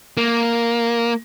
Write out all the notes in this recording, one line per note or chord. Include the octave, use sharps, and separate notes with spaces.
A#3